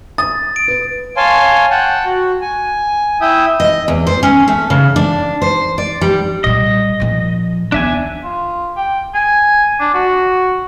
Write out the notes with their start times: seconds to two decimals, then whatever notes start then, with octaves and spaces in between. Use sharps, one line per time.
0.18 D#6 A6
0.56 D7
0.68 B4
1.17 C#5 F5 G#5 A5 C6
1.71 F#5 G5 A5
2.05 F#4
2.42 G#5
3.21 E4 E5 G5 D#6
3.60 D#5
3.88 E2
4.07 C5
4.23 C#4
4.48 A3
4.70 C#3
4.96 D4
5.42 C5
5.78 D5
6.01 G3
6.44 A#2 G3 D#5
7.00 A#2 F3
7.72 D#2 B3 D4 E5 G#5
8.24 F4
8.77 G5
9.14 G#5
9.80 D4
9.94 F#4